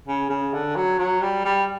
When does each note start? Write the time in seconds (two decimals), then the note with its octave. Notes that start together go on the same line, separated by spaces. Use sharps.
0.08 C#3
0.30 C#3
0.54 D3
0.76 F#3
0.99 F#3
1.22 G3
1.45 G3